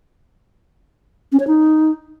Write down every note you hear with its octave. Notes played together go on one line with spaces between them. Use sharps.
C#4
C#5
D#4